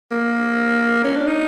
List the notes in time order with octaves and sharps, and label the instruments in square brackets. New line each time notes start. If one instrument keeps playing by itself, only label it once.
[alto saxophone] A#3
C#4
D4
D#4